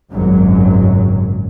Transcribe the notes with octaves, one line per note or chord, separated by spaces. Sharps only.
G#1 C#2 F#2 A#2 F#3